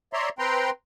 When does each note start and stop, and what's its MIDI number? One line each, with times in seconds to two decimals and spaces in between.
0.13 0.29 73
0.13 0.29 74
0.13 0.29 76
0.13 0.29 82
0.13 0.29 84
0.39 0.70 60
0.39 0.70 71
0.39 0.70 79
0.39 0.70 82
0.39 0.70 84